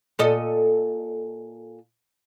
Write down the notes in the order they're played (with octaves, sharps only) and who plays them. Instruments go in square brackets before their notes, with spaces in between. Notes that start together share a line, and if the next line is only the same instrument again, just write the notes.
[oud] A#2 A4 D#5